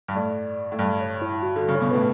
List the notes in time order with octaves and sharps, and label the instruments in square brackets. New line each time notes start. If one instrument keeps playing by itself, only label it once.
[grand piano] G2
[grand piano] A2 [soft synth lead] D5
[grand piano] A2
[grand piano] G2 [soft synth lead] D5
[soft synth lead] C#5
E4
F#4
[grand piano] D3 [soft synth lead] F#4
[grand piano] C#3
[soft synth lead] C#5
[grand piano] B2
[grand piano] A2 [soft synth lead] B4